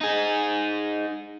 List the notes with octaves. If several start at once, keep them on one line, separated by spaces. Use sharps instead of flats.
D#4 G#4